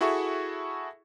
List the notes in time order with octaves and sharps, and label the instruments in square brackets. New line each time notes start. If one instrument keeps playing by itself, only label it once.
[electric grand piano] E4 F#4 G#4 A4 E5 C#6